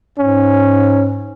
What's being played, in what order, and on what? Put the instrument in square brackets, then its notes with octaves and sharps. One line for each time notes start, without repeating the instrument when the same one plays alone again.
[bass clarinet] G#2 [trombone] C#4